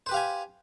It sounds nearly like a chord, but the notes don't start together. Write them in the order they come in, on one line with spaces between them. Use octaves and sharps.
C5 B4 G4 F5 G#5